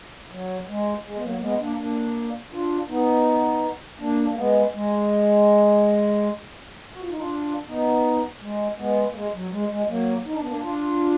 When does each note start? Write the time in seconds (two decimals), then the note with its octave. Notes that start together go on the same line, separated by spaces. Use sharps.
0.32 F#3
0.68 G#3
1.05 G#3
1.16 B3
1.23 F#3 A#3
1.35 A#3
1.41 G#3 B3
1.59 A#3 D4
1.78 A#3 D4
2.51 D4 F4
2.89 B3 D#4
3.99 A#3 D4
4.28 A#3
4.36 G#3 B3
4.74 G#3
6.94 F#4
7.02 F4
7.09 D#4
7.18 D4 F4
7.68 B3 D#4
8.42 G#3
8.78 G#3 B3
9.10 A#3
9.15 G#3
9.34 F#3
9.52 G#3
9.70 G#3
9.89 F#3 A#3
10.26 D#4
10.33 D4
10.41 B3
10.48 A#3 D4
10.63 D4 F4